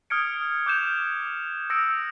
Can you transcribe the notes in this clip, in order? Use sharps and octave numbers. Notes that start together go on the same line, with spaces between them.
D#6 F6 F#6 G#6 C#7 D7
D6 G6 E7 F7
D#6 E6 A#6 C#7 D7